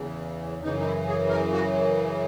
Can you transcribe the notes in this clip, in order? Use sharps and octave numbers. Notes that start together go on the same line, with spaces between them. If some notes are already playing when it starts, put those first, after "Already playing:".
Already playing: E2 C#3 E3
F#2 C#3 E3 D#4
D#4
E4
G#4
A#4
F#4